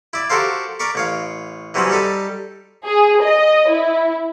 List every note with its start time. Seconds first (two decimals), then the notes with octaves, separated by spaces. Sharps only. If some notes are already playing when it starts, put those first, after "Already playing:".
0.13 E4 D5
0.30 F#4 G4 A4 A#4 C5 F5
0.79 A#4 D5 B5 C#6
0.95 A1 C#5 F5
1.74 E3 F#3 G3 C4 C#4 F#4
1.90 G3 D#4 A4 B5
2.85 G#4
3.23 D#5
3.70 E4